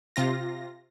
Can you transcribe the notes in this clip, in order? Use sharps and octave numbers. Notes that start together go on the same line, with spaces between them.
C3 F4 A#6